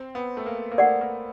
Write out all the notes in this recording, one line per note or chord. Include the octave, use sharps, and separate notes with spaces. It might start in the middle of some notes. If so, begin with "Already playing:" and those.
Already playing: C4
B3
A3
A#3
A#3
A3 A#4 D5 F#5
A#3